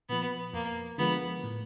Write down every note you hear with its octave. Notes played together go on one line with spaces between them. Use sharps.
A#2 F3 B3
F2 A#3
D3 F3 G#3 B3
A2